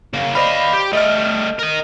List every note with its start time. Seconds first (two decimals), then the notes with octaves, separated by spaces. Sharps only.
0.14 C#3 A#3
0.35 C5 D5 D#5 F5 B5
0.73 G4
0.93 G3 A3 D#5 F6
1.59 A#4 D#5